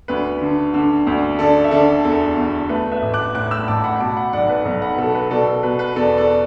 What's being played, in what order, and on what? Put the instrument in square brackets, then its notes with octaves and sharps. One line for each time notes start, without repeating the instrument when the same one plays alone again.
[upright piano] D2 B4
D3
D3
D2
D3 A4 D5
E5
D3 A4 D5
E2 A4
E2
A3 B4
B4 E5
A1
D6 F#6
A2 D6 F#6
B5 E6
A1 A5 D6
F#5 B5
B2 A5 D6
F#5 B5
B1 D5 F#5
B4
B1 B4
F#5 B5
B2 A4
B4
B2 A4 D5
A4
B2 B4
B4
E2 A4 D5
A4 D5